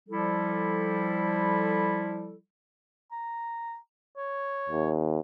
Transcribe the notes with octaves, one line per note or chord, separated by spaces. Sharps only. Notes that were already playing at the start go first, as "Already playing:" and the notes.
F3 G3 E4 A4
A#5
C#5
D#2